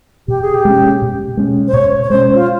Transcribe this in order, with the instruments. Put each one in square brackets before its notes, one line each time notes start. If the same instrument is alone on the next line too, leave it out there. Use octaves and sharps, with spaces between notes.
[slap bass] B2 [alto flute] G4
[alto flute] G#4
G4
[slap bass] G#3 C#4
B2
G#3 C#4
[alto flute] C5
[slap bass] B2 [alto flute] C#5
[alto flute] C#5
[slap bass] G#3 C#4 [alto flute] C5
[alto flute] F4